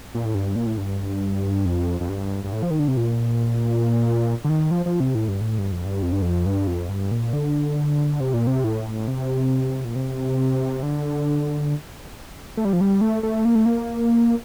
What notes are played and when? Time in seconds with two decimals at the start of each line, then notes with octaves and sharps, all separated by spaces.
0.15 A#2
0.25 A2
0.35 G2
0.56 A#2
0.67 A2
0.78 G2
1.65 F2
2.01 F2
2.09 G2
2.45 G2
2.53 A2
2.63 F3
2.71 D#3
2.79 D3
2.88 C3
2.97 A#2
4.45 D3
4.49 D#3
4.71 F3
4.86 F3
5.00 C3
5.15 A2
5.28 G2
5.41 A2
5.58 G2
5.72 F2
5.86 G2
6.02 F2
6.12 G2
6.22 F2
6.46 G2
6.67 F2
6.89 G2
7.11 A#2
7.33 D3
8.20 C3
8.34 A#2
8.47 C3
8.64 A2
9.08 C3
9.85 A#2
9.95 C3
10.83 D3
12.57 A3
12.65 G3
12.73 F3
12.81 G3
13.01 A3
13.23 A3
13.45 A#3
13.55 A3
13.66 A#3